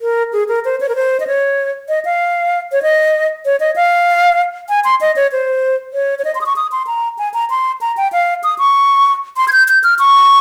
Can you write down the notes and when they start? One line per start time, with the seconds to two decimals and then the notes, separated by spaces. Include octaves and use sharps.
0.01 A#4
0.33 G#4
0.48 A#4
0.65 C5
0.80 C#5
0.89 A#4
0.95 C5
1.20 D#5
1.27 C#5
1.89 D#5
2.05 F5
2.72 C#5
2.83 D#5
3.45 C#5
3.60 D#5
3.76 F5
4.69 G#5
4.84 C6
5.01 D#5
5.16 C#5
5.32 C5
5.93 C#5
6.19 C#5
6.25 D#5
6.35 C6
6.41 D#6
6.46 C#6
6.56 D#6
6.72 C6
6.87 A#5
7.18 G#5
7.34 A#5
7.50 C6
7.81 A#5
7.97 G5
8.13 F5
8.44 D#6
8.58 C#6
9.37 C6
9.48 G#6
9.53 G6
9.68 G6
9.84 F6
9.99 C#6